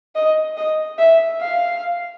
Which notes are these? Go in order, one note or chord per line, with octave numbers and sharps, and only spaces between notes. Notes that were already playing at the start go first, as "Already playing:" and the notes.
D#5
D#5
E5
F5